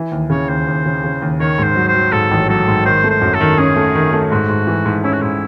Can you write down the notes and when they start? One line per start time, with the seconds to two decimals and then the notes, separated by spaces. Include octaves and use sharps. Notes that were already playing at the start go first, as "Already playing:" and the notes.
Already playing: E3
0.11 D#2
0.30 C#3 C#5
0.49 D#2 C5
0.67 D#2
0.86 C#3
1.04 C#3
1.22 D#2
1.40 D#3 C#5
1.58 G#2
1.64 C5
1.76 F#3
1.88 C5
1.94 F#3
2.12 G#2 A4
2.31 A1
2.49 F#3 A4
2.68 G#2
2.85 D#3 C5
3.04 A3
3.10 C5
3.21 F#2
3.34 A4
3.41 D#3
3.58 C#4 G#4
3.76 A3
3.95 D#3
4.13 A3
4.31 G#2 F#4
4.49 G#2
4.67 E3
4.86 G#2
5.04 C#4 E4
5.13 F#4
5.21 G#2 E4